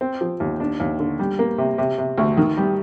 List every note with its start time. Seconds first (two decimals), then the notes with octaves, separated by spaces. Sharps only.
0.01 C4
0.21 F3
0.40 D#2
0.60 D4
0.80 D#2
1.00 D3
1.19 G3
1.39 A#3
1.58 C3
1.78 C3
1.98 C3
2.18 D2
2.37 D#3
2.57 G3